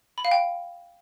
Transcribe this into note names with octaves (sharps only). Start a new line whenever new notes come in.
B5
F5
G5